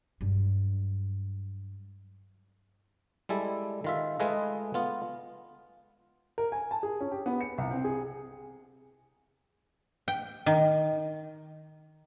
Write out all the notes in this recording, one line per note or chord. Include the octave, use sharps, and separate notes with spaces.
G2 F#3
G3 G#3 E4 A4
D#3 F4 E5
G#3 A3 F4 G#4 B4 D#5
B3 F4
A#4
G#5
A5
G#4
C#4
G4
B3
C#7
C2
C4
G#4
G5
D#3